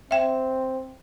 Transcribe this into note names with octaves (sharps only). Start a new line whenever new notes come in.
C4 E5 G5